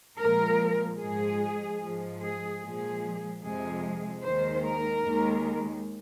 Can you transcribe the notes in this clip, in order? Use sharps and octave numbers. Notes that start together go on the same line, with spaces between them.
A#2 F3 G#3 A#4
G#2 F3 G#3 G#4
G#2 F3 G#3
G#4
A#2 F3 G#3 G#4
F2 C3 F3 G#3 G#4
D#2 D#3 G#3 C5
A#4
D#2 D#3 G#3